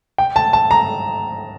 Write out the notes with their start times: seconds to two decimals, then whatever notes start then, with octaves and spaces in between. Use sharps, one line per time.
0.18 G5
0.36 A5
0.53 A5
0.71 A#5